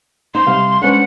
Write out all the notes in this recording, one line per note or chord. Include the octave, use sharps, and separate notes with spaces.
D#4 C5 C6
C3 G3 F5
G#3 C#4 D4 B4 C5 F#5